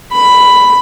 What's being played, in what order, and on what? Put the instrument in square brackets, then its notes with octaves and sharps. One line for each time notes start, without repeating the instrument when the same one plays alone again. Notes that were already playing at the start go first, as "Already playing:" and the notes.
[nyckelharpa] B5